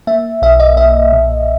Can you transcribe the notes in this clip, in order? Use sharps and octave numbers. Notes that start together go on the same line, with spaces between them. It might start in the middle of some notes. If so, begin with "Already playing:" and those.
A#3 E5
B1 E5
D#5
B1 E5
A#2